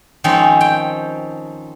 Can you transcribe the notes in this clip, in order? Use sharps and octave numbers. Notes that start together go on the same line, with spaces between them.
D#3 F3 G#3 C4 C#4 D#4
G5